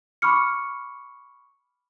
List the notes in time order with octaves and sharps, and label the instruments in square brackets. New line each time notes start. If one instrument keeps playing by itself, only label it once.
[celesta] B5 C#6 D6 F6 C#7